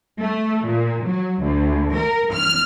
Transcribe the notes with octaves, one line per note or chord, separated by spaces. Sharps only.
A3
A#2
F#3
D2
A#4
F6